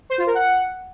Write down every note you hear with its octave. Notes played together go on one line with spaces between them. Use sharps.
C5
F4
A#4
F#5